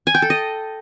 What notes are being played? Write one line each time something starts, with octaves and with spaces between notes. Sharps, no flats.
G#5
G5
A4
D#5